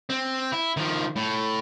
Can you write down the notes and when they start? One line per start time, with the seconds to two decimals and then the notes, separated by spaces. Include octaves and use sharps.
0.10 C4
0.52 E4
0.77 D#3 F3
1.16 A2